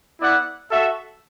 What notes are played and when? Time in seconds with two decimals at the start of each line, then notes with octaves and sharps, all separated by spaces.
0.20 B3 E4 D5 F#5
0.71 F#4 A4 E5